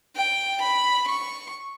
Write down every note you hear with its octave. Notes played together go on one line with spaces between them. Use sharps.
G5
B5
C#6